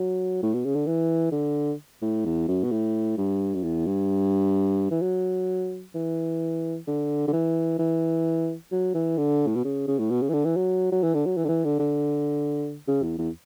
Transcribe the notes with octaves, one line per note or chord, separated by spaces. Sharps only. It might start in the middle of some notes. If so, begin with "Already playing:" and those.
Already playing: F#3
A2
B2
C#3
D3
E3
D3
A2
E2
F#2
B2
A2
G2
F#2
E2
G2
E3
F#3
E3
D3
D3
E3
E3
F#3
E3
D3
A2
B2
C#3
C#3
A2
B2
C#3
E3
D3
E3
F#3
F#3
E3
D3
F#3
E3
D3
E3
D3
D3
C#3
E2
E2